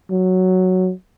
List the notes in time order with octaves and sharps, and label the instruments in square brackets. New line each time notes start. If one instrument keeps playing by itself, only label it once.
[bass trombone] F#3